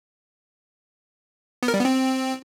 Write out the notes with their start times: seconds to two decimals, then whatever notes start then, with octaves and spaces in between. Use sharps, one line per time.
1.63 B3
1.68 A#4
1.74 G3
1.79 B3
1.85 C4